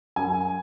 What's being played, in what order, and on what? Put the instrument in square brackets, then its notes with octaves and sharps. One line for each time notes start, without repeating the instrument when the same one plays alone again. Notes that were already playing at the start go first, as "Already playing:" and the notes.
[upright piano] F#2 G#5